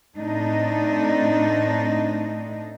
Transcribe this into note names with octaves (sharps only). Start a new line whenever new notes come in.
A2 A3 C4 D4 D#4 D#5